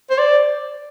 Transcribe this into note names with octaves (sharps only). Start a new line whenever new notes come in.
C5
D5